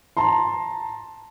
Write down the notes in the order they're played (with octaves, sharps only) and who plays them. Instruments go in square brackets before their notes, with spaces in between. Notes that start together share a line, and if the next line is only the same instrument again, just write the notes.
[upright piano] A5 A#5 C6